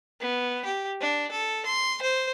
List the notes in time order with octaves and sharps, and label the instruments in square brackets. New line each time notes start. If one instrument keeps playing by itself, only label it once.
[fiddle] B3
G4
D4
A4
C6
C5